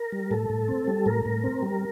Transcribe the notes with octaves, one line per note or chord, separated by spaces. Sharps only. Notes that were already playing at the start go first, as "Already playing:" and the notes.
Already playing: A#4
G3
A2 A4
A2
C4
G3
A2 A#4
A2
C4
G3